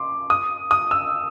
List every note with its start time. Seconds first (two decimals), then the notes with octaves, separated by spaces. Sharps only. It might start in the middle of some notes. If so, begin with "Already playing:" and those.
Already playing: C6 D6
0.30 D#6
0.71 D#6
0.91 E6